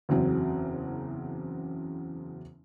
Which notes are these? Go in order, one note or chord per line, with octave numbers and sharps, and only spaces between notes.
F#1 E2 C#3 F#3 C4